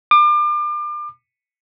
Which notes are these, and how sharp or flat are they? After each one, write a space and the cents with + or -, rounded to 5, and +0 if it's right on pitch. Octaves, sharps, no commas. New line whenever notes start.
D6 +35